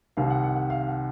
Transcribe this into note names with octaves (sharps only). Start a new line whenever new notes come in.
C2 C3 D#3 F5
F#5
F#5
F#5
F5
F#5